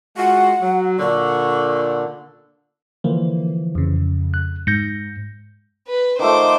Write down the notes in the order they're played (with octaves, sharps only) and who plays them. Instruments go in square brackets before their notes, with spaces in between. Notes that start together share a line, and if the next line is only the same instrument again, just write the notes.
[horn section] G#3 F4 F#4 [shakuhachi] F#5
[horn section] F#3
[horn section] A#2 D3 [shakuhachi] C#6
[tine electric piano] D3 E3 F3 [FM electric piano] A#3
[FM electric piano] F2 C#3
[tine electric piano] F#6
[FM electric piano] G#2 [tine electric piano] G6 A#6 C#7
[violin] B4
[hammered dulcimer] D#3 F3 A3 [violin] C5 D6